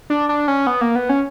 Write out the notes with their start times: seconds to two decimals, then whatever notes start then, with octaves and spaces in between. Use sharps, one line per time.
0.10 D4
0.29 D4
0.48 C#4
0.67 B3
0.81 A#3
0.95 B3
1.09 C#4